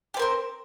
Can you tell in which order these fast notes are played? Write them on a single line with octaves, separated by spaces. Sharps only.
G4 C4 A#4 C5